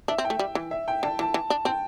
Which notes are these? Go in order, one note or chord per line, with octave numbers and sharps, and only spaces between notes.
D4 E5
C4
G5
A3
G3
E3
E5
G5
D3 A5
E3 A5
E3
D4
C4 G5